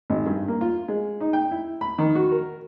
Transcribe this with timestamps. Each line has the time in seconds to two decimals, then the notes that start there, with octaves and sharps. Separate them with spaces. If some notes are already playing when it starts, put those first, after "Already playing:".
0.10 G#1
0.26 G2
0.48 A#3
0.61 F4
0.88 G#3
1.21 D#4
1.33 G5
1.51 E4
1.81 B5
1.98 D#3
2.15 F#4
2.31 A#4